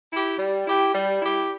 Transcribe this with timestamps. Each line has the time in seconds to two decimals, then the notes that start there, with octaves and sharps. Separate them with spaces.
0.11 E4 G4
0.38 G3
0.66 E4 G4
0.94 G3
1.21 E4 G4